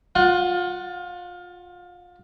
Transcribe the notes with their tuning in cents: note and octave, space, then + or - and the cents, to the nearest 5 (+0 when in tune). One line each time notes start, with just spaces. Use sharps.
F4 +25 F#5 +0